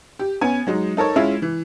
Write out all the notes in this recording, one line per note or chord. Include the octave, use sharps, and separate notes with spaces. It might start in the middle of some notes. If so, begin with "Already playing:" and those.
G4
B3 C#4 G#5
F#3 G#3 D#4
D#4 A4 A#4 C#5
G#3 C#4 E4 F4 E5
E3